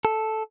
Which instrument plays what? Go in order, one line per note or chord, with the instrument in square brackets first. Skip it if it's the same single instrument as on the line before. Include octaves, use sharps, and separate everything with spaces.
[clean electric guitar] A4